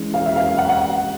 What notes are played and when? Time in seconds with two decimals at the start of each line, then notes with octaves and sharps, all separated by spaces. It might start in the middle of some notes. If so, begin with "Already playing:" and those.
Already playing: E3 G#3 C#4
0.14 F5
0.26 E5
0.36 F5
0.47 F5
0.58 F#5
0.69 F#5